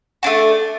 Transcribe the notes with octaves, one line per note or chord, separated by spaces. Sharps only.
A3 D4 F#4